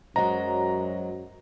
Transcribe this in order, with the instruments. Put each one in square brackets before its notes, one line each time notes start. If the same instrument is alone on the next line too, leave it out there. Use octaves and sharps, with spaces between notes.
[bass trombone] F#2 [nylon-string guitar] F#3 G#3 [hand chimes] C5 D#5 F#5 [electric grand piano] A#5